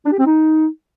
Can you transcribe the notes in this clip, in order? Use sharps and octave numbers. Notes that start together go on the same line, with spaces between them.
D4
G4
C4
D#4